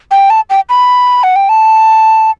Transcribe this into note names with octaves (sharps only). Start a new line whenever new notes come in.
G5
A5
G5
B5
F#5
G5
A5